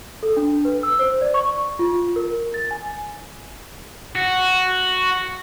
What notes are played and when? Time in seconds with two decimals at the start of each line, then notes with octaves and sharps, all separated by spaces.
0.23 A4
0.37 D4
0.65 B4
0.83 E6
0.99 C5
1.21 D5
1.34 C#6
1.79 F4
2.16 A#4
2.54 A6
2.71 G#5
4.15 F#4